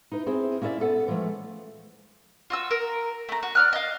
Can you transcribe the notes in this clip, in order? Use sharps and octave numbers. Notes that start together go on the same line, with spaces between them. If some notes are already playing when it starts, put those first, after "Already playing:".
D#4 E4 B4
C4 E4 G#4 C5
A#3 C#4 E4 C5 D5 E5
B3 A4 F#5
E3 F3 G#3 A3 C#4
F4 F#4 E6
A#4
A3 A#5
F#4
D5 F6 F#6
D#5 F5